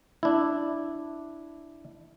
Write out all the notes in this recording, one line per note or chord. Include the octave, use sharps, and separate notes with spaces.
D4 E4